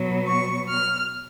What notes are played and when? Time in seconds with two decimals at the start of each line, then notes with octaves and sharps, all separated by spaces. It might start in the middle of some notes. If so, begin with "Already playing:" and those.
Already playing: B2 F#3 B3
0.27 C#6
0.69 F6